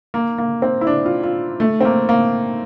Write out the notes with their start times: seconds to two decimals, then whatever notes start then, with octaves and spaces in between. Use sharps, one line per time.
0.14 A#3
0.38 A#3
0.62 C4
0.81 E4
0.87 D4
1.06 F4
1.23 F4
1.60 A3
1.81 C4
1.85 A#3
2.09 A#3